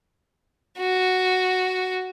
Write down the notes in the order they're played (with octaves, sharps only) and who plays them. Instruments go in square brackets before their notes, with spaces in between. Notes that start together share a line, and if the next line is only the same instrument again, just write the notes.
[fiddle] F#4